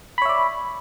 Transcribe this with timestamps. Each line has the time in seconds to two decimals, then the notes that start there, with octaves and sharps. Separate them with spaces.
0.18 B5
0.22 C#5
0.25 E5
0.29 D5